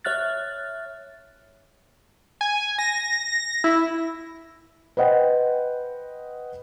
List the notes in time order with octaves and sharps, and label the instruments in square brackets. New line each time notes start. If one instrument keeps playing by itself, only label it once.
[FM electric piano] C#5 E5 F6 F#6 A6
[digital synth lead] G#5
A#6
E4
[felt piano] B4 C5 D#5 F#5 G5